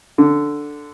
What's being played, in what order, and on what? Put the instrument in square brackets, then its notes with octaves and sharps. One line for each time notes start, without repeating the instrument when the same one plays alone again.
[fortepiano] D3